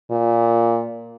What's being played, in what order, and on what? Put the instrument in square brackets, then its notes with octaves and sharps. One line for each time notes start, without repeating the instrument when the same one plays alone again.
[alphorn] A#2